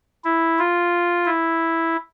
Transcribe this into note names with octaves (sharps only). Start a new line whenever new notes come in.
E4
F4
E4